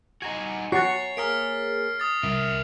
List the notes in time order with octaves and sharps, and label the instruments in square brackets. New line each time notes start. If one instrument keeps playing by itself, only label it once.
[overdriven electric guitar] D#4 F#4 [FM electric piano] G#5 A#5
[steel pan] F#4 [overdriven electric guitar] C#5 [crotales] A6 C7
[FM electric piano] A#3 G#4 A#4 [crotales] F6 B6 D7
[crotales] D#6 A6
[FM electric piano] C2 [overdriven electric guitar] A#4 E5